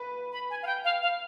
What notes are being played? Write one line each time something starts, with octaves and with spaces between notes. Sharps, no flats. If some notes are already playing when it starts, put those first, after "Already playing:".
Already playing: B4
B5
G#5
F5
G5
F5
F5